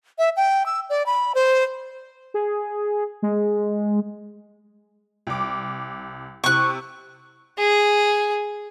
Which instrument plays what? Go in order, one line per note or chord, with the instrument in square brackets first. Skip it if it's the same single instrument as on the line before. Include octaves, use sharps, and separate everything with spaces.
[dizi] E5
G5
E6
D5
B5
C5
[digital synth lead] G#4
G#3
[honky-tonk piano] C2 D6
[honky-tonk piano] C3 E4 [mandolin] C#6 F#6
[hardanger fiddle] G#4